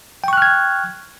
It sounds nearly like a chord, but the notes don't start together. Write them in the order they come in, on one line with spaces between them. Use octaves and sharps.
G5 C#6 F#6 F6 G#6